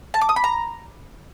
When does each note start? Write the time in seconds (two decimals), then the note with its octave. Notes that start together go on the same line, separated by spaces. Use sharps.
0.14 A5
0.21 D6
0.29 D#6
0.36 B5
0.44 A#5